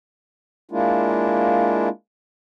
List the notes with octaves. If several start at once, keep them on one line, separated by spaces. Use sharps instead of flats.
G#3 A#3 D4 E4 F4